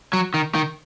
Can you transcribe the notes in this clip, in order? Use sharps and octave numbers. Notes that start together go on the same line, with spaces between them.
F#3
D#3
D#3